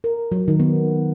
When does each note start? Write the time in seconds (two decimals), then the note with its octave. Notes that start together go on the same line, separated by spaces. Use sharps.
0.04 A#4
0.32 F#3
0.48 D#3
0.60 B3